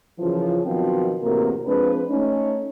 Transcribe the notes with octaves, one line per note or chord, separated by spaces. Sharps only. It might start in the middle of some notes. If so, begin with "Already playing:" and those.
F#2 C#3 E3 F3
B2 D#3 F3 F#3 B3 C4
E2 A2 C3 A#3 F#4 A#4
F3 G#3 C4 D4 B4
A3 C#4 D#4